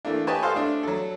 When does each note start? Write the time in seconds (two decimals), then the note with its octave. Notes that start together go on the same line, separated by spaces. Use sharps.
0.05 E3 A3 A#3 D4
0.27 G4 B4 C#5 D#5 G#5 A5
0.42 A4 C5 D#5 F5
0.54 A3 D4
0.83 F#3 A4